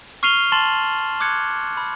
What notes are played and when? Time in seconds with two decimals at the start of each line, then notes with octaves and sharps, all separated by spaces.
0.23 C#6 F6 C7 D#7 F7 G7
0.52 A5 C6 A6 E7 F#7
1.20 D6 F#6 G#6 C#7
1.77 B5